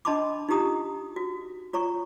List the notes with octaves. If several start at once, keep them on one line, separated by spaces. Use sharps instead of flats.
D4 D#5 A5 B5 C6 D6
D#4 F4 G4 A#5 D#6
F#4
F4 C#5 A#5 C#6